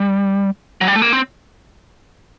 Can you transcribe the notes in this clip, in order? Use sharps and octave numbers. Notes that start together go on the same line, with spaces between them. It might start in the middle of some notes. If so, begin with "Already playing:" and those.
Already playing: G3
F#3
G3
A3
A#3
C4